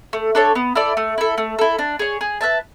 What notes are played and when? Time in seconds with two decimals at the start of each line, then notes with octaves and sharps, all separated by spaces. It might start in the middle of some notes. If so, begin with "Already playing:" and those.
0.13 A3
0.35 D4 A4 C#5
0.55 B3
0.75 E4 A4 D5
0.97 A3
1.18 E4 A4
1.38 A3
1.59 E4 A4
1.79 D4
1.99 G#4 C#5
2.21 G#4
2.41 B4 E5 A5